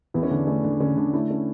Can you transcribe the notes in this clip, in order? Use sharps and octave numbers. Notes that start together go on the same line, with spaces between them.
E2 E4
C#4
D3 D4
A3 C#4
D3 D4
D3 C#4
D3 D4
A3 E4
C#4